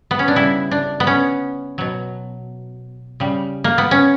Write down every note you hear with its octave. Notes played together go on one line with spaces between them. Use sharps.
B3
C#4
D4
C#3 G3 E4
D4
B3
C#4
B2 F#3
C#3 G3
A#3
B3
C#4